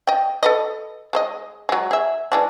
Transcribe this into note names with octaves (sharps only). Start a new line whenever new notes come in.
D#5 G5
A4 B4 D#5
G#3 C5 D#5
F#3 G#3
G#4 E5
E3 G#3 D4